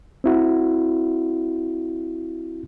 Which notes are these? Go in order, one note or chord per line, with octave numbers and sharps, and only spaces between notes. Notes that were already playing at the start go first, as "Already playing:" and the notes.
C4 E4 F#4